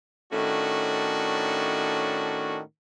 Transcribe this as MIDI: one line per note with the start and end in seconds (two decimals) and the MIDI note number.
0.33 2.60 45
0.33 2.60 51
0.33 2.60 57
0.33 2.60 61
0.33 2.60 62
0.33 2.60 66